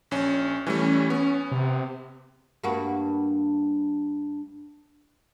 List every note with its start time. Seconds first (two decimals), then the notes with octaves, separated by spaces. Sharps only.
0.11 A#1 C#4
0.67 E3 G3 A3 C#4
1.10 B3
1.51 C3
2.64 G2 A#3 F#4